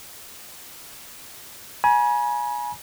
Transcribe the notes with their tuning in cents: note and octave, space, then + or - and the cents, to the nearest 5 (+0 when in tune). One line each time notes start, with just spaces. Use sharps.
G#5 +15 B5 -45